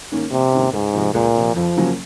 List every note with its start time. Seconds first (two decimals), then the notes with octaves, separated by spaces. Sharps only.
0.11 G#2 D#3 A#3 C#4
0.32 A#1 C3
0.52 G#2 D#3 A#3 C#4
0.73 C#2 G#2
0.93 C3 F3
1.14 C#2 A#2
1.35 C3 F3
1.56 F2 F3
1.76 C#3 F#3 A#3 C#4